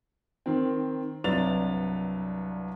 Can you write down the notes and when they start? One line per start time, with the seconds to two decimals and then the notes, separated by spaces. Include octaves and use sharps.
0.46 D#3 C4
1.24 C2 G2 F#3 B4 A6 F7